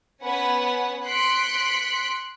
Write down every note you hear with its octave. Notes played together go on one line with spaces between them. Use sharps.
B3 C#4 B4 F#5 G#5
C6 F#6 B6 C#7 D7